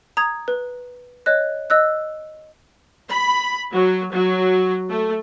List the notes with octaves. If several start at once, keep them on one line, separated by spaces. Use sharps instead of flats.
A#5 D#6 G#6
B4
C#5 D#5 F#6
D#5 E6 F#6
B5
F#3
F#3
A3